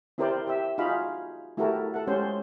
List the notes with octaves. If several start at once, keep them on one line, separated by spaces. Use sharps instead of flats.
C4 E4 G4 A#4 C5 D5
G4 E5
D#4 F4 F#4 G#4 F5 B5
A3 E4 F#4 G4 A4 A#4
A4 F#5
G#3 C#4 G4 C5